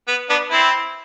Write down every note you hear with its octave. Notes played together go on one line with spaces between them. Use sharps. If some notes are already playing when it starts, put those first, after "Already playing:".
B3
B3 D4
C4 E4